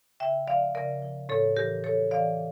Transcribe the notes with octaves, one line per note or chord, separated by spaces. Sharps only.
C#3 E5 G5
F3 D5 F5
C#3 A#4 D5
F3
A2 A4 C#5
E3 G4 A#4
A2 A4 C#5
E3 D5 F5